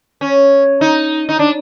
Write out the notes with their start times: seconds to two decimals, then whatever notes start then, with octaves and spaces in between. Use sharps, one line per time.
0.21 C#4
0.81 D#4
1.29 D#4
1.39 D4